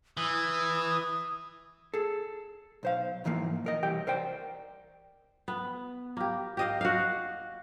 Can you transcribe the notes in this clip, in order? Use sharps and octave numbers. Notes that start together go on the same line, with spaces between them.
E3 D#6
G#4 A4
B1 C5 F5
B1 G#2 E3 F3 A#3
B1 A#4 D#5
C2 E3 G4 G5
A#4 C5 D5 G5
B3
A#3 G4
G4 D#5 F5
F#4 F5